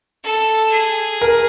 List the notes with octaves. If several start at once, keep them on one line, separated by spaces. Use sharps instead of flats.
A4
G#4
A#4